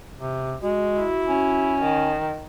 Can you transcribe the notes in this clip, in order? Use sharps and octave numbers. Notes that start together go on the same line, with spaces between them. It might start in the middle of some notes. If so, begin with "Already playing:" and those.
C3
G#3 F#4
E4
C#4
D#3